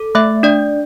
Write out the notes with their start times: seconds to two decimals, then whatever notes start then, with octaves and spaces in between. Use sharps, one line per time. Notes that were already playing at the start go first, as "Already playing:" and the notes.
Already playing: A4
0.15 A3 E5
0.43 D4 D5